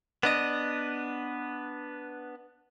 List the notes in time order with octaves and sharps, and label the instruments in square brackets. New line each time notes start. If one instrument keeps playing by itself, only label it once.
[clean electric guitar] B3 D4 D#5